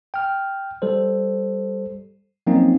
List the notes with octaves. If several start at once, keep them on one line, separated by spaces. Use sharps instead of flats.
G5 F6
G3 A4 C5
F3 F#3 A#3 C4 C#4 D#4